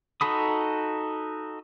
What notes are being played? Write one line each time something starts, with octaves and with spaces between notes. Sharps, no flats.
D#4 F#4 A4 B5 D#6